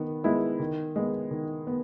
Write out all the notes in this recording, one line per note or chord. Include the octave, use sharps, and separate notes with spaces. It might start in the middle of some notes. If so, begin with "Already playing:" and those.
Already playing: D#3 B3
G#3 B3 E4
D#3
G#3 B3
D#3
B3